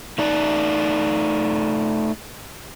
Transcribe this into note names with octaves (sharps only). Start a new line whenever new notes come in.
A3 D#4 D5